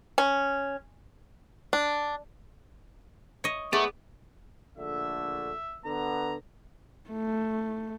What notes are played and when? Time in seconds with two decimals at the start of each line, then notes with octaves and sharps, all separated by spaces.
0.18 C#4
1.73 D4
3.44 C#5 D#5
3.73 A3 B3 G#4 D5
4.78 A#1 D3 A3 E5
5.86 D3 B3 A#5
7.10 A3